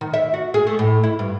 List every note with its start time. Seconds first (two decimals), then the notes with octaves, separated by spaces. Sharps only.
0.01 D#3
0.14 E5
0.34 F#4
0.54 G#4
0.67 A3
0.79 A2
1.04 E4
1.19 G2